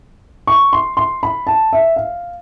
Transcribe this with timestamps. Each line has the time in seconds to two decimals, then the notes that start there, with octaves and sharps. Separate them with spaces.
0.47 C#6
0.73 C6
0.97 C6
1.23 B5
1.47 A5
1.73 E5
1.96 F5